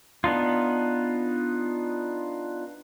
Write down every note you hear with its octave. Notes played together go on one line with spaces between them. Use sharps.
B3 D4 D#4 F4